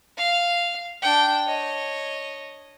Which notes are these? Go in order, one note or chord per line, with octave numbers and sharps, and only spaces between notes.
F5
D4 G5
C#5 D#5